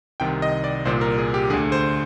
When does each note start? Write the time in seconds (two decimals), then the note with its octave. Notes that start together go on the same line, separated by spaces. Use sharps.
0.20 C2 C3 D#3 G5
0.42 D#5
0.64 D5
0.85 C2 A#2 C5
1.01 A#4
1.18 G#4
1.34 G4
1.50 D3 G#4
1.53 D2
1.72 C5